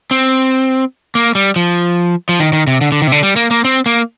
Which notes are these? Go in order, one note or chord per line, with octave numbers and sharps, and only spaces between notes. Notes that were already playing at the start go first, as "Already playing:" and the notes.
C4
A#3
G3
F3
F3
D#3
D#3
C3
D3
D3
D#3
C3
D3
G3
A#3
A#3
C4
A#3